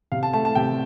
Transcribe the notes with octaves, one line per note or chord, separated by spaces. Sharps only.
C3 F5
A5
A3 A5
A5
C3 G5